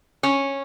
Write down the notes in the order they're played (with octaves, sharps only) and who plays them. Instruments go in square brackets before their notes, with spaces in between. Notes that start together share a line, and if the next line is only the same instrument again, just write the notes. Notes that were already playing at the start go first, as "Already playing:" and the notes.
[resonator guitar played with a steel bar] C#4